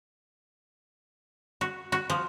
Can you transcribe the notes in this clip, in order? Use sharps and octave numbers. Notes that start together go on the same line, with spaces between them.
F#4
F#4
F3